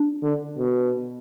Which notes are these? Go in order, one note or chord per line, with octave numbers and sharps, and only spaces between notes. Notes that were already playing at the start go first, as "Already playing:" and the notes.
Already playing: D4
D3
B2